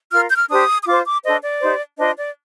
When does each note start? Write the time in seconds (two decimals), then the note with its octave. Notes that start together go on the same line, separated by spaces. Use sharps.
0.12 F4 A#4 F6
0.29 G6
0.37 F6
0.49 D4 G4 C5 D#6
0.83 D#6
0.87 F4 C5 D6
1.05 D6
1.23 D4 A4 C5 D#5
1.43 D5
1.61 D#4 G4 C5
1.98 D4 F4 C5 D#5
2.17 D5